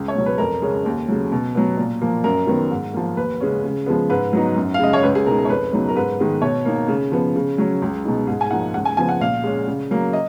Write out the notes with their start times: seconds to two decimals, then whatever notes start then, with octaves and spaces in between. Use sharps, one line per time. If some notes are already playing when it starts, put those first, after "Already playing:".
Already playing: C#2
0.08 C#5
0.15 B2 F#3 C#4
0.26 B4
0.38 F2 A#4
0.62 C#3 G#3 C#4
0.86 D#2
1.08 C#3 F#3
1.32 B2
1.55 F#3 B3
1.77 A#2
2.02 F3 A#3
2.24 F#2 A#4
2.47 D#3 F#3 B3
2.71 G#2
2.93 F3 A#3
3.17 D#2 B4
3.41 C#3 G#3 C#4
3.64 C#3
3.86 F3 G#3 B3
4.10 G#2 B4
4.33 F#3 B3 D#4
4.56 F#2
4.74 F5
4.79 C#3 G#3 D#5
4.93 C#5
5.03 C#2 B4
5.15 G#4
5.26 B2 G#3 D#4 A#4
5.38 A#4
5.45 C#5
5.49 F2 B4
5.73 C#3 F#3 B3 D#4
5.89 A#4
5.96 G#2 B4
6.19 D#3 G#3 B3
6.42 B2 C#5
6.65 A#3 D#4
6.88 C#3
7.12 F3 B3
7.36 C#3
7.58 F#3 C#4
7.82 C#2
8.05 B2 G#3 D#4
8.27 G#2 G#4
8.41 G#5
8.51 F3 A#3 D#4 F#5
8.74 C#2 F#5
8.85 G#5
8.97 C#3 F3 B3 G#5
9.09 F#5
9.20 A#2 F5
9.44 G#3 C#4
9.68 C#3
9.91 F#3 A#3
10.13 D#5